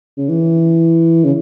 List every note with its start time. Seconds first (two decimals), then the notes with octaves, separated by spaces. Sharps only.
0.18 C#3
0.29 E3
1.24 C#3